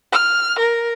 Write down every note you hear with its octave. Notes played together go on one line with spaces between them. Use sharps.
F6
A#4